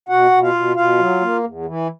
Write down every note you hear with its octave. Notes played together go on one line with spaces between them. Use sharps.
B2 F#4 F#5
B2
F4 F5
B2
B2 F4 F5
F#3
A#3
E2
E3